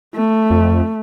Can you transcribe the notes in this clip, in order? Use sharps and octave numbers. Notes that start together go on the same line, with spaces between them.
A3
F2